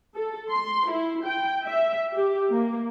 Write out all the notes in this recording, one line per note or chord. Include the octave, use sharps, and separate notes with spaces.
A4
C6
E4
G5
E5
G4
A#3